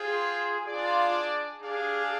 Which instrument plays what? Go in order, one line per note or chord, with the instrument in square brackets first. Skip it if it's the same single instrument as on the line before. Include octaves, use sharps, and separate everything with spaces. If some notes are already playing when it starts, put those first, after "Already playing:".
Already playing: [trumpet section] F4 C5 G5 [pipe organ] G#4
[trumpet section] D4 G#4 D5 [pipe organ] F4
[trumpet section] D4 G4 D5 F5 [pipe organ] G#4